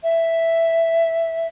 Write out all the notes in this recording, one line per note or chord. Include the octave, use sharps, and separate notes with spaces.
E5